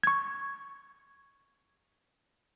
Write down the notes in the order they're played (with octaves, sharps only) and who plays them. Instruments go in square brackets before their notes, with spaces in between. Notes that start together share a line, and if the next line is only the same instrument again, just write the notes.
[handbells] C#6 G#6